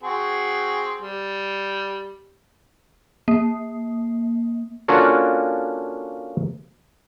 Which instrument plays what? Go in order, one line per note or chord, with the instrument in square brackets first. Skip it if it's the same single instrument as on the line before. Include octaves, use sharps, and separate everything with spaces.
[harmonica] C4 F#4 G#4
G3
[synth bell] A#3
[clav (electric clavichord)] A#3 C#4 D4 F4 F#4 A4